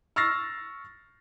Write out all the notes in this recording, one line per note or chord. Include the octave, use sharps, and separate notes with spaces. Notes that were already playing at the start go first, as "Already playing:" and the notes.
C#6 E6 F6 A6 A#6 C7